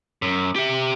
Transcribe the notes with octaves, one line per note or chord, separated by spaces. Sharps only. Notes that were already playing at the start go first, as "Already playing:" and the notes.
F#2
G4 E5